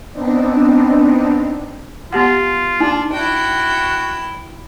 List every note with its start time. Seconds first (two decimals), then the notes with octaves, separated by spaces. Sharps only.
0.12 B3 C4 D4 D#4
2.13 B3 F4 G4 F#5
2.80 D4 D#4
3.12 E4 F#4 G5